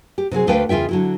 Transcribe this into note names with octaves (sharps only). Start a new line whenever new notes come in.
G4
C3 F#3 C4 G#4
D2 A3 B4 F5 G5
E2 C#3 F4 E5 G5
D3 F#3 E4